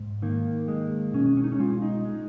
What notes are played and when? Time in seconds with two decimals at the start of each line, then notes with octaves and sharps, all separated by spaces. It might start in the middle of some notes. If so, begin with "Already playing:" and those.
Already playing: G#2
0.22 D#3 A#3
0.68 G#3
1.13 B2 C#4
1.37 C#4
1.44 D#4
1.52 C#4
1.59 G#3 F4
1.82 D#4
2.05 G#3